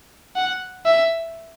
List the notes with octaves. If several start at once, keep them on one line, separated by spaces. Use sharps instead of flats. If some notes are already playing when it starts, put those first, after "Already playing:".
F#5
E5